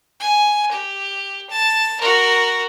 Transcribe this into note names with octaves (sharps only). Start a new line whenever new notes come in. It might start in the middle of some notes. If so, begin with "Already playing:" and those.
G#5
G4
A5
F#4 A#4